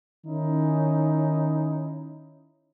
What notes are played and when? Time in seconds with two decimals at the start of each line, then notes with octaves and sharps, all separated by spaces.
0.25 D#3 C#4 D#4 E4